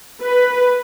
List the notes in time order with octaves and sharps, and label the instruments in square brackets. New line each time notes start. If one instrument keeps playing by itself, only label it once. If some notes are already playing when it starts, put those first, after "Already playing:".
[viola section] B4